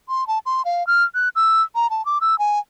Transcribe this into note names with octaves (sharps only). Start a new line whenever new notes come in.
C6
A5
C6
F5
F6
F#6
E6
A#5
A5
D6
E6
G#5